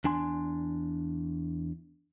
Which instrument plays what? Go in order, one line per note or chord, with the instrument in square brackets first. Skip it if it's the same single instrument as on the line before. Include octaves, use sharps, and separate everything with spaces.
[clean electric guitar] E2 D4 G#5 C6